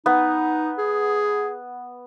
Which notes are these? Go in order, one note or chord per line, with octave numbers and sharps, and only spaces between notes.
B3 D#4
G#4